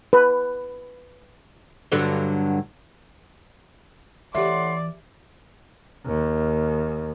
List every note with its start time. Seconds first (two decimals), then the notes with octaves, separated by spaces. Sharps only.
0.13 B4
1.92 G2 D3 F#3
4.35 A2 E3 G4 D5 E5 F#5 C6
6.06 D#2